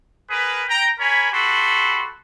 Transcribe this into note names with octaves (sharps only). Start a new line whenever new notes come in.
G#4 A#4 B4
G5 A#5
A#4 C#5 G#5 B5
F#4 G4 A4 B5 C6